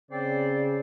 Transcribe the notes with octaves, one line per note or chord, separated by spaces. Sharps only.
C#3 C4 C5 D5